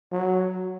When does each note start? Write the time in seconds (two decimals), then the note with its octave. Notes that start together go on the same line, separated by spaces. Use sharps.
0.12 F#3